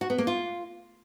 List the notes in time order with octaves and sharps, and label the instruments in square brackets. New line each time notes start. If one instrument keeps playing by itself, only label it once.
[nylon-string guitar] F#4
B3
A#3
F4